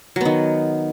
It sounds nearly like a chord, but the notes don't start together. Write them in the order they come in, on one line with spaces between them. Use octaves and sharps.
F#3 B3 D#3